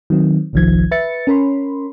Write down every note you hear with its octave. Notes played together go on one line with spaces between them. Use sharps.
D#3 F#3 C4
G1 C2 D#3 F3 G#6
B4 E5 A6 C#7
C#4 A#4 C#5 B5 C6